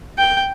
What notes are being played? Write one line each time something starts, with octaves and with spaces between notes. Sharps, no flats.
G5